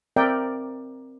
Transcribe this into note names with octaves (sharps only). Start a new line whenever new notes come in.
C4 A#4 D5 E5 G5